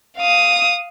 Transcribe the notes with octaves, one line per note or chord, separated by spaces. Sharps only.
F5 D#6